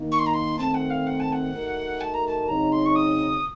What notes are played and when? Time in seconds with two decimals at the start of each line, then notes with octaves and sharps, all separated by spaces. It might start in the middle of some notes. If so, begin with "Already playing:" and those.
Already playing: D#3 A#3 D#4
0.12 C#6
0.19 C6
0.26 A#5
0.34 C6
0.58 D#3 A3 C4 A5
0.74 F#5
0.90 F5
1.07 F#5
1.20 A5
1.32 F#5
1.53 A3 D#4 F#4 A#4
2.01 A5
2.14 A#5
2.27 A5
2.48 C#3 F#3 C4 D#4 A#5
2.72 C6
2.86 C#6
2.95 D#6